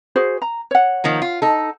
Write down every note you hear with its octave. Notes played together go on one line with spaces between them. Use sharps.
F#4 G#4 C5
A#5
C#5 F#5
D#3 F3 A#3
F4
D#4 A4